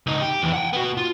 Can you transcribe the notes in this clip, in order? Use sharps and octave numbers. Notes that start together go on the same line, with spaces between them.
C#2 D#4
G4
E2 E3
F#5 G5
B3 F#4
F4